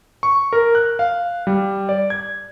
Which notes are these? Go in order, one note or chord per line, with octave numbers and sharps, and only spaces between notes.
C#6
A#4
F#6
F5
G3
D5
G#6